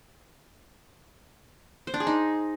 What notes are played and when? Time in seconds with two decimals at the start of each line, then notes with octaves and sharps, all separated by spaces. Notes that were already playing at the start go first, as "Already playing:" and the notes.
1.87 C5
1.94 D4
2.00 G#4
2.07 D#4